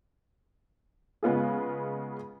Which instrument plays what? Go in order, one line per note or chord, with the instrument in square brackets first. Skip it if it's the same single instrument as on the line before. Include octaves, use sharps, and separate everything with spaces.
[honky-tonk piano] C#3 G#3 B3 F4 G#4